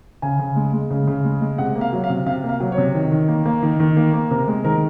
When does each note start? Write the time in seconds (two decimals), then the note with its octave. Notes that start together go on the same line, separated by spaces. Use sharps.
0.22 C#3 G#5
0.39 C#3
0.56 G#3
0.73 G#3
0.91 C#3
1.07 C#3
1.25 G#3
1.42 G#3
1.58 C3 F#5
1.76 A#3
1.81 F5
1.93 F#3
2.04 F5
2.09 C3
2.26 C3 F5
2.44 A#3
2.49 F5
2.60 F#3
2.72 C#5
2.78 C3
2.95 D#3
3.11 D#3
3.28 A#3
3.46 A#3
3.62 D#3
3.80 D#3
3.97 A#3
4.14 A#3
4.31 C3 A#4
4.48 G#3
4.64 D#3 A#4